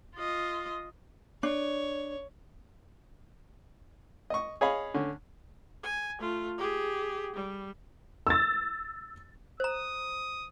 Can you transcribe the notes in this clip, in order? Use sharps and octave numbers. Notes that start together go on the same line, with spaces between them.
F4 D#5
D4 C#5
D#5 C#6
G#4 C#5 D#5 F5 B5
D3 C#4
G#5
A3 F4
G4 G#4
G3
E6 A6
C5 A#5 D#6